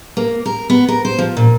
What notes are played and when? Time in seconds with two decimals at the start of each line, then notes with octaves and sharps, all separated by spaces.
0.17 A#3
0.46 A#4
0.70 B3
0.88 A#4
1.05 C5
1.19 F3
1.37 A#2